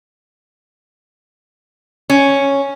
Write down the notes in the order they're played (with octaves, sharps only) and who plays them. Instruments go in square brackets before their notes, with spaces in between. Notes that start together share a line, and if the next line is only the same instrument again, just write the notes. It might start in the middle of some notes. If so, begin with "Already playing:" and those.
[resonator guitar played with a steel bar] C#4